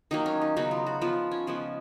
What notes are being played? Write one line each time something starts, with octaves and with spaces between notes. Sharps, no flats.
D#3 F#3 A#3 D#4
C#4
D#4
C#3 F#3 B3 D#4
F4
F#4
F3 B3 F4
C#4
C#3 F3 G#3 B3